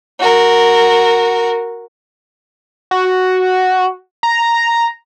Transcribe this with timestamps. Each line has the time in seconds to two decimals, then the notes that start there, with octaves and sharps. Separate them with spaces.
0.19 F#4 A#4
2.91 F#4
4.23 A#5